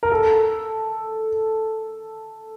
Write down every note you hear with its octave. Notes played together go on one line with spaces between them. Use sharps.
A#4
A4